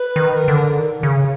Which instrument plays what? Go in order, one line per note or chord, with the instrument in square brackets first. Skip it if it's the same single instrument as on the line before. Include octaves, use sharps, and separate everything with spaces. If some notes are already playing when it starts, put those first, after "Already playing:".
Already playing: [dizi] B4
[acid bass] D#3
[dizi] B4
A#4
[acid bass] D3
D#3
C#3